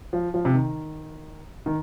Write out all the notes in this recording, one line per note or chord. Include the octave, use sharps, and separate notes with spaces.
F3
F3
C3
D#3
D#3